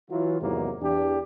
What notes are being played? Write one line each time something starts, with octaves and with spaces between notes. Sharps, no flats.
E3 F#3 F4
E2 G#2 C3 D#3 F#3 A#3
E2 D4 G4